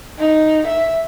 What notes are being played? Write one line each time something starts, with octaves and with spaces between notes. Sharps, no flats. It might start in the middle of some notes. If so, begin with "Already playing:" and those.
D#4
E5